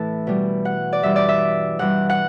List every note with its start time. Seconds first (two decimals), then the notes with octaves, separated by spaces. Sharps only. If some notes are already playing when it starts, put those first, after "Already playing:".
Already playing: A2 E3 E4 A5
0.27 B2 G3
0.65 F#5
0.93 D5
1.03 G2 E3 G3 E5
1.16 D5
1.29 E5
1.79 G2 E3 G3 F#5
2.10 F#5